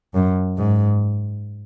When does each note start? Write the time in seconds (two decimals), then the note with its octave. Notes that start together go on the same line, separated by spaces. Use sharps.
0.14 F#2
0.57 G#2